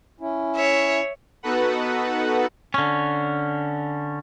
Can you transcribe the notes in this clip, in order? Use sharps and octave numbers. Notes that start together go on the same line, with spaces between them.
C#4 E4
C#5 E5
B3 D#4 F#4 A4 B4 F#5
D3 C#4